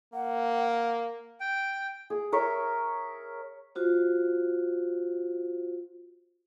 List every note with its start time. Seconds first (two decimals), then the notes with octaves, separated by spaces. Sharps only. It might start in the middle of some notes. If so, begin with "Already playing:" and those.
0.14 A#3 F#5
1.40 G5
2.10 G#4
2.32 A#4 C#5 E5
3.75 F4 F#4 C5